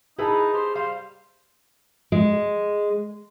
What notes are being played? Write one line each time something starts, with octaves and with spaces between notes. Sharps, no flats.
D#4 E4 G#4 B4 A5
G4 C5
G3 C5 F5
G#3